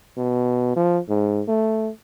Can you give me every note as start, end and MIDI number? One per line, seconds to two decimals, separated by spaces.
0.17 0.71 47
0.76 0.98 53
1.09 1.41 44
1.48 1.90 57